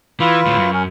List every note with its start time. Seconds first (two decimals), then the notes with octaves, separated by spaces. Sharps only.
0.20 E3 F4 B4
0.46 D2 A2
0.58 F#2
0.73 C#4 A#4